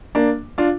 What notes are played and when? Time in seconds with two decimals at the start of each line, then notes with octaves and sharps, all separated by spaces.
0.15 A#3 D4
0.58 D4 F4